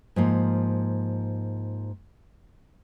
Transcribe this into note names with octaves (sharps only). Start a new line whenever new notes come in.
G#2 F3 A#3